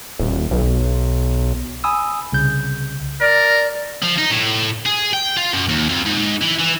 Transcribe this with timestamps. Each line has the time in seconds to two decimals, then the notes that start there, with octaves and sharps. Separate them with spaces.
0.19 D#1
0.51 B1
1.84 G#5 B5 D#6 E6
2.32 C2 C#3 G6
3.21 A#4 D5
4.03 F3
4.18 D#4
4.31 A2
4.86 G#4
5.13 G5
5.37 F4
5.54 F#2
5.69 D#2
5.89 F2
6.06 G#2
6.42 E3
6.59 E3